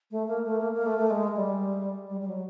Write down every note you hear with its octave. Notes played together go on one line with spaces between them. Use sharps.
A3
A#3
A3
A#3
A#3
A3
A3
G#3
G3
G3
G3
F#3